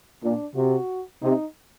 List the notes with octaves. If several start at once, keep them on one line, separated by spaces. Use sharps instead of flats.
A#2 D4
C3 F#4
C3 D#4